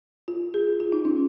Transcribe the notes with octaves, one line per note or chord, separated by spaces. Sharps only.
F4
G#4
F4
D#4
C#4